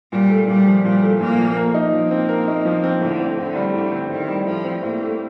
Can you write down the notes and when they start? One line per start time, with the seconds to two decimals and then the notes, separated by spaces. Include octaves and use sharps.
0.12 A#2 G3
0.30 A3
0.48 A#2 G3
0.67 F3
0.84 A#2 G3
1.03 A3
1.21 A#2 A#3
1.38 F3
1.57 A#4
1.74 D#4
1.93 F3 A#3
2.11 C4
2.29 A#4
2.48 D#4
2.65 F3
2.84 C4
3.02 A2 D3
3.19 C4
3.37 A2 D3
3.56 G3
3.74 A2 D3
3.92 C4
4.11 A2 D#3
4.28 G3
4.46 A2 F3
4.65 C4
4.83 A2 A#3
5.02 A3